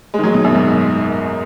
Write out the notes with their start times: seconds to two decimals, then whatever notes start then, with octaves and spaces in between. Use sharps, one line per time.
0.14 G#3
0.19 D#3
0.23 F#3
0.34 B2
0.44 F#2
0.54 G#2